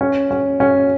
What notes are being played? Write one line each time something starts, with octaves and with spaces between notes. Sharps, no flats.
C#4
C#4
C#4